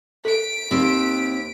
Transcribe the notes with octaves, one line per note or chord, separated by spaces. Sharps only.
A4 B6 D7
D#2 C4 C5